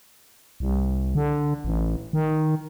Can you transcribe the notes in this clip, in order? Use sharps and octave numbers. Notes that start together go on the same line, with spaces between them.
C2
D3
A1
D#3